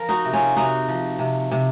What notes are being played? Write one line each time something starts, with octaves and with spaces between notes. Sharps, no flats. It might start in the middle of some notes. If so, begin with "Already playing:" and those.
Already playing: F3 A#4
D#4 F#4
C3
C#4 F4
C3 D#4 F#4
F3
C3
C3